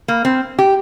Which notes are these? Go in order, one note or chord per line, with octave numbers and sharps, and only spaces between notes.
A#3
C4
G4